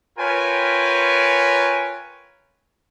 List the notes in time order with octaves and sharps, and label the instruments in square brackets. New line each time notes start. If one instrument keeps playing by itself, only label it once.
[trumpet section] F4 A#4 B4 C#5 G5 G#5